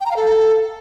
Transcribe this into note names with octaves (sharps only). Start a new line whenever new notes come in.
G5
A#5
F5
A4